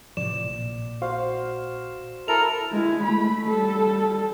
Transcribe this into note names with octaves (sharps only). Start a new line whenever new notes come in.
A2 C3 F3 D5 E7
A#1
F#4 C5 F5
E4 A4 A#4 F7
G#3 E4
A3 B5
G3 A4